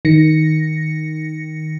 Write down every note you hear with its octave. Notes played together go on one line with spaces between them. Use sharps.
D#3 A#6 C#7